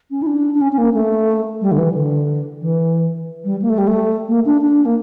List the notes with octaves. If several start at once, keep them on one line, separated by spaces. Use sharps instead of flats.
C#4
E4
D4
D4
C#4
C#4
A#3
A3
G3
D3
E3
D3
E3
G3
A#3
A3
G3
A3
A#3
D4
D4
A#3